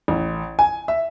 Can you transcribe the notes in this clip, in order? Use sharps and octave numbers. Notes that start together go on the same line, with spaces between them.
A1
G#5
E5